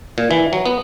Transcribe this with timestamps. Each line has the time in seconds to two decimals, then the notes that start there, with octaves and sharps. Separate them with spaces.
0.18 A#2
0.31 E3
0.53 F#3
0.66 B3